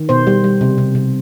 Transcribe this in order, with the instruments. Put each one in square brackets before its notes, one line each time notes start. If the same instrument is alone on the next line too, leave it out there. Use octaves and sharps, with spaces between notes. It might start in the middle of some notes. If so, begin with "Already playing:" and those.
Already playing: [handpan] D#3
B2 C5
G3
G3
C3
C3
C3